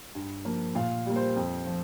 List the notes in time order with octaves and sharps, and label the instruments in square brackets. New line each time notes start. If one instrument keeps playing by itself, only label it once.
[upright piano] G2
F3 A#3
A#2 F5
G3 A#3
C5
F2
F3